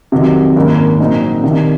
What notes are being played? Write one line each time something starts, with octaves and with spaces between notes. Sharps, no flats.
F2 C3 D#3 F#3
G#1 F#2 D#3 A#3 D#4
A#1 A#2 F#3 C4 D#4
C2 C3 D#3